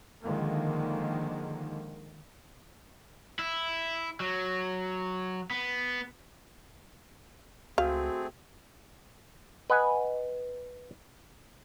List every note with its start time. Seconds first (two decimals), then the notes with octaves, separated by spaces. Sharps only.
0.23 D3 D#3 F3 G#3 A#3
3.39 E4
4.20 F#3
5.51 B3
7.78 C#2 A3 C4 F#4 G#4 F5
9.70 B4 D#5 F#5 G#5